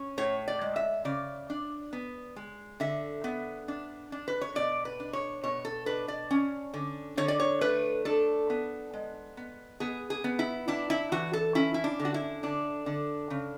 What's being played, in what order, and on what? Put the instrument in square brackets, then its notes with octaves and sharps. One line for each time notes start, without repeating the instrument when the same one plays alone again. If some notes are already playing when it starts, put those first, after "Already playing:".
Already playing: [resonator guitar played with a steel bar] C#4
A2 C#5
D5
G#3
E5
C#3 D5
D4
B3
G#3
D3 E5
B3
D4
D4
B4
C#5
B2 D5
B4
D4
C#5
B2 C#5
A4
D4 B4
D5
C#4
D3
D3 C#5
D5
C#5
A3 B4
D4 A4
B3
G#3
B3
B3 G#4
G#4
B3
E4
D4 E4
E4
E3 F#4
A4
C#4 E4
E4
D4
D3
F#4
E4
D3 D4
D3
C#3